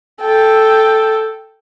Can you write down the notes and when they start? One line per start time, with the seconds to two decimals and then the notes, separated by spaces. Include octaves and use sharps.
0.21 A4 G5